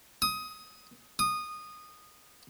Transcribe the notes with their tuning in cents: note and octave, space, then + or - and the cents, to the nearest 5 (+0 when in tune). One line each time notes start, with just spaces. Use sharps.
D#6 +20
D#6 -15